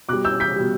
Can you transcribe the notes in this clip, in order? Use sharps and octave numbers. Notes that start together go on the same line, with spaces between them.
B2 G3 D6 F#6
E6 G6
G6 B6
B2 G3